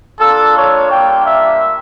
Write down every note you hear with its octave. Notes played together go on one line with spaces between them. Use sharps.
A#3 D4 F4 A4
C#5
G3 A#3 D4 F4 G5
E5